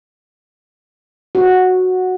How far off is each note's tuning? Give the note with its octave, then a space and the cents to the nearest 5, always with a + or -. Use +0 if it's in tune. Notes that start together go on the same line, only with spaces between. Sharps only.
F#4 -5